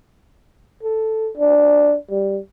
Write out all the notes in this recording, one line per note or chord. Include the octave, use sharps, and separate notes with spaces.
A4
D4
G3